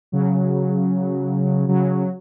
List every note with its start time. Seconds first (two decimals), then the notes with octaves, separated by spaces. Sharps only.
0.12 C#3 F#3
1.68 C#3 F#3